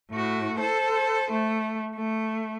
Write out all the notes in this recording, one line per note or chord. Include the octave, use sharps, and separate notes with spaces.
A2 F#4
A4 C5
A3
A3